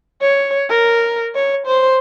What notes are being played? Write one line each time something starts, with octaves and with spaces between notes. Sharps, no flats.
C#5
A#4
C#5
C5